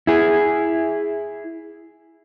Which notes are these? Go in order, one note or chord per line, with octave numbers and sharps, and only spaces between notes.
E4 G#4